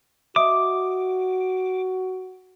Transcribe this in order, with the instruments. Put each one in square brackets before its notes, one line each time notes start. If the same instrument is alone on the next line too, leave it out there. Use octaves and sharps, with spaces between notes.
[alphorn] F#4 [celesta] D#5 E5 D#6 [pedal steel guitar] D6